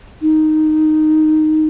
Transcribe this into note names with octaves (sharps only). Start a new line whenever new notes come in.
D#4